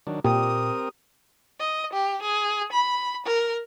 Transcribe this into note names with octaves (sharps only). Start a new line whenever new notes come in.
D#3 F#3 D4
A#2 C4 G4 A#4 D#6
D#5
G4
G#4
B5
A#4